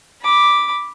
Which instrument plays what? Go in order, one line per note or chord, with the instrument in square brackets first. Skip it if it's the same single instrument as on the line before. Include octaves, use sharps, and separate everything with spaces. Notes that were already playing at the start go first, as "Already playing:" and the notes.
[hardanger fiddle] B5 D6